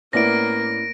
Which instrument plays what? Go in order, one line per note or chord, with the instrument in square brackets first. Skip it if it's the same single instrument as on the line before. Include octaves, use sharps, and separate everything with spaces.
[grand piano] A2 B3 D5 [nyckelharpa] A#3 [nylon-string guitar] C#4 E4 [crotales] A#6 D7